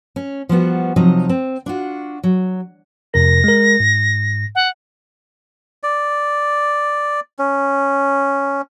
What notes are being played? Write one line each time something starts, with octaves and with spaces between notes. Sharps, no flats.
C#4
F3 G3 B3 F#4
C3 F3 F#3 D#4 D#5
C4
D4 F4 F#4
F#3
F2 C3 A#4 A#6
G#3 A#4
G#2
F#5
D5
C#4